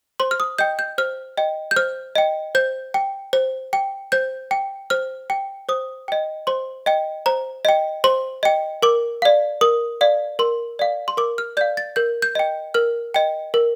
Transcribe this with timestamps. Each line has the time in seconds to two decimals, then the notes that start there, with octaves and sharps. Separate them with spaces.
0.20 C5 C6
0.31 F6
0.40 D#6
0.58 D#5 G5 G6
0.79 G6
0.98 C5 F6
1.37 D#5 G5
1.71 G6
1.76 C5 F6
2.15 D#5 G5
2.55 C5 G6
2.94 G5
3.33 C5
3.73 G5
4.12 C5 G6
4.51 G5
4.90 C5 F6
5.30 G5
5.69 C5 D#6
6.08 D#5 G5
6.47 C5 C6
6.86 D#5 G5
7.26 C5 A#5
7.65 D#5 G5
8.04 C5 C6
8.43 D#5 G5
8.83 A#4 D6
9.22 D5 F5
9.61 A#4 D#6
10.01 D5 F5
10.39 A#4 C6
10.79 D5 F5
11.08 C6
11.17 A#4 D6
11.38 F6
11.57 D5 G6
11.61 F5
11.77 A6
11.96 A#4 G6
12.22 G6
12.35 D#5 G5
12.74 A#4 F6
13.14 D#5 G5
13.54 A#4